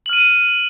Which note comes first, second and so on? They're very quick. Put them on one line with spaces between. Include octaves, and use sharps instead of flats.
F#7 F6 D#7